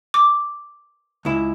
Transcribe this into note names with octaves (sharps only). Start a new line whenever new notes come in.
D6
C#2 E4